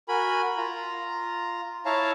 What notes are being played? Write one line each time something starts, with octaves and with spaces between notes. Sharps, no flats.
F#4 A#4 G#5 B5
F4 A#5
E4 C#5 F5 A5 A#5